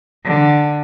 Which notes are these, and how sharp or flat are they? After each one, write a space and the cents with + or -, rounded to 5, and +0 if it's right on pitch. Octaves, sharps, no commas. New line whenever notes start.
D3 +10